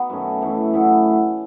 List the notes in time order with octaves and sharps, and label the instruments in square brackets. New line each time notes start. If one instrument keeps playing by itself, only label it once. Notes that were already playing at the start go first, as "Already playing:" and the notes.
Already playing: [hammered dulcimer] B3 D#4 F#4
F#2 D#3 A3 C#4
F#2 E3 A3
A2 F#3 B3 E4